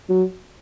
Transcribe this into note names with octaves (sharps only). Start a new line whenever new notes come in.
F#3